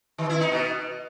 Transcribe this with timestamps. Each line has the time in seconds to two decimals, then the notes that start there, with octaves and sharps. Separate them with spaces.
0.18 D#3
0.30 E4
0.41 D#4
0.52 B2